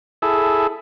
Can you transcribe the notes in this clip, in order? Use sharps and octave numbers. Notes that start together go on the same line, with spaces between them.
E4 G#4 A4